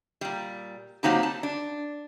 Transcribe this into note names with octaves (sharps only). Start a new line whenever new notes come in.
A#2 G3
F#3 A#3 C4 D#4 G4
A5
D4